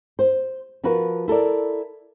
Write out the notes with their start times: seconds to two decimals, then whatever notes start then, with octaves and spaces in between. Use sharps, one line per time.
0.19 C5
0.84 F3 F4 F#4 A#4 B4
1.28 E4 A4 A#4 D5